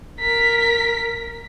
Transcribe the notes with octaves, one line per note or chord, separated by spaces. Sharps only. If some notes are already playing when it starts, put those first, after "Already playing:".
A#4 B6